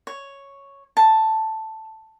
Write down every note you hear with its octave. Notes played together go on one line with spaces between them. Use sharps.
C#5
A5